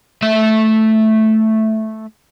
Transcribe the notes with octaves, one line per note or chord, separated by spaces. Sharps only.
A3 E5